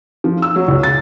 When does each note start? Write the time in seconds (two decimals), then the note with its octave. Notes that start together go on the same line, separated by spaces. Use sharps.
0.24 F3
0.42 E6
0.56 F#3
0.68 C#2
0.83 A6